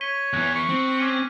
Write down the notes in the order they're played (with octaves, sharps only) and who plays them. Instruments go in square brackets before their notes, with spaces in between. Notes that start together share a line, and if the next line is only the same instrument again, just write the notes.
[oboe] C#5 [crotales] B6 D#7 G7
[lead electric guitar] E2 E3 [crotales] F#6
[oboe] C#6
[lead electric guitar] C4
[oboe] C#4 [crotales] D6 D#7